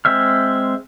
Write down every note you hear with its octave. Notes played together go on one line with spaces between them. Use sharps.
G#3 C4 E5 F6